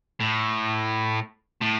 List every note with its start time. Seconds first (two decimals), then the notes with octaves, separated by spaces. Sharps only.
0.20 A2
1.62 A2